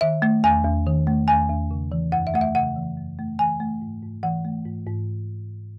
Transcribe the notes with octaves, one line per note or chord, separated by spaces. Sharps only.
D#3 E5
A3
E2 G#5
E2
D#3
A3
E2 G#5
E2
C#3
E3
F#2 F#5
E5
A3 F#5
E5
C#3 F#5
E3
F#2
A3
E3 G#5
A3
G#2
G#2
E3 F#5
A3
G#2
G#2